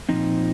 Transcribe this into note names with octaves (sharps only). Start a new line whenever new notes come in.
A#2 F3 C4 D#4